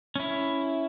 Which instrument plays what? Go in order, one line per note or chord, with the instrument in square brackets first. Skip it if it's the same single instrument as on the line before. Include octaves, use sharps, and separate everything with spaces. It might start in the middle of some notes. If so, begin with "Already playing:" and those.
[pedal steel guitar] C#4 E4